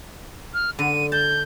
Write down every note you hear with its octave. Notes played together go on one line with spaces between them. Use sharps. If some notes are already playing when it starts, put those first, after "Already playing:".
F6
D3 D#7
A5 G6